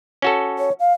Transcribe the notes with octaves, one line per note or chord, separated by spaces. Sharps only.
C#4 F#4 A4
C#5
F5